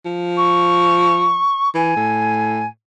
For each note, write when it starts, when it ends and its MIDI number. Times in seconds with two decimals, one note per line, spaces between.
0.05 1.43 53
0.37 1.69 85
1.74 1.95 52
1.74 2.66 80
1.96 2.66 45